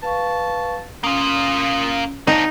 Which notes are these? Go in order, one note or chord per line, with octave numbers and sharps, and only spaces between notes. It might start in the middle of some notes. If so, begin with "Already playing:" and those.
B4 F5 A5 C#6
A#3 C#4 F4 D#6
C4 D4 D#4 F5